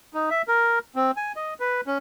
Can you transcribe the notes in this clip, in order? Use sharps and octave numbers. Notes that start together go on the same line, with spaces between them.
D#4
E5
A#4
C4
G#5
D#5
B4
C#4